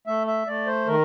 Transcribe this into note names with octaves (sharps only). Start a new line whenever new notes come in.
A3 E5
E5
A3 D5
C5
D#3 A#4